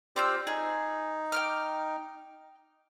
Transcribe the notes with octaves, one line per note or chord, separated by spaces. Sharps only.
C4 F4 G4 C5 D5 E6
D#4 G#4
G5 D6 F6